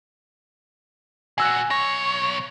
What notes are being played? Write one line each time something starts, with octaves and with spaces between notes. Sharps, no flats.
A#2 F#4 G#5 E6 F#6
B1 C#5 A#6